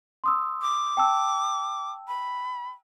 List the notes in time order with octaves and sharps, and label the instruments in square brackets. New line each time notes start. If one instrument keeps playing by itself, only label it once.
[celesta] C6 D#6 E6
[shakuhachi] D6
[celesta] G5 A5 E6
[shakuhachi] B5